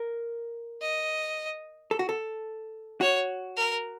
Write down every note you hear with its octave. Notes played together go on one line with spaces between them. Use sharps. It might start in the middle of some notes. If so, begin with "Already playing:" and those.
Already playing: A#4
D#5
A4
F#4
A4
F#4 C#5
A#4